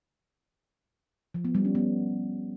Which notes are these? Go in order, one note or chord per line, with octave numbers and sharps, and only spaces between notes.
F3
B3
G3
C#4
B3